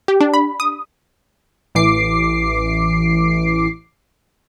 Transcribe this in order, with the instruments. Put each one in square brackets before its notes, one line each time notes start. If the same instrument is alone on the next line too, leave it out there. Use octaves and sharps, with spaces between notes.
[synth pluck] G4
D4
B5
D#6
[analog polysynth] A1 E3 D6 C7